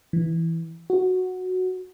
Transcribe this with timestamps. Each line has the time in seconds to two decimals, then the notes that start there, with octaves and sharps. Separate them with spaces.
0.13 E3
0.90 F#4